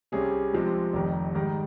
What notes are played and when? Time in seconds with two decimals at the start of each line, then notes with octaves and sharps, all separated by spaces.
0.12 C2 C3 G3 C#4 G#4
0.53 C2 C3 F3 G#3 C4
0.93 F1 F2 D#3 G3
1.34 G#2 D#3 G3